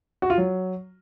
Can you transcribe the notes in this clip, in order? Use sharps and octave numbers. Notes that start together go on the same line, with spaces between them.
F#4
F4
F#3